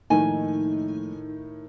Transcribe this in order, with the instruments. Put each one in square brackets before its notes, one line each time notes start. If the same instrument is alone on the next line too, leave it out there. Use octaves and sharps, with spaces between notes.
[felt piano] A2 D#3 [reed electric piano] F3 A3 A#3 [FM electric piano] D#4 [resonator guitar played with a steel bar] G#5